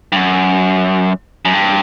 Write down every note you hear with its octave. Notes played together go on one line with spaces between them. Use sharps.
G2
F#2
F#2
G2